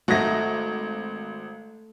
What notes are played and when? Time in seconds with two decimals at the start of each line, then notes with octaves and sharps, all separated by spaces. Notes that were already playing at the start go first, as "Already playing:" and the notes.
0.08 G#1 A3 D#4 F#4 A#6